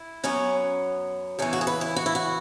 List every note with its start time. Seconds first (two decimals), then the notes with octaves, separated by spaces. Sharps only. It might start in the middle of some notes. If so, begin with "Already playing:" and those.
Already playing: E4
0.24 F#2 F#3 B3 C#4
1.39 E2 C#3 E3 C#4
1.53 F#4
1.61 G#4
1.67 B4
1.81 E4
1.96 F#4
2.06 E4
2.15 F#4